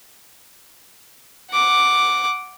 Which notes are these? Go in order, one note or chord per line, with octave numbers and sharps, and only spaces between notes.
F#5 D6